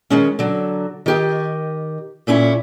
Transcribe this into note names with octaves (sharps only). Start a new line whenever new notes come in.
D#3 G#3 C#4
D3 F#3
D#3 G4 D#5
A#2 A3 C#4 E4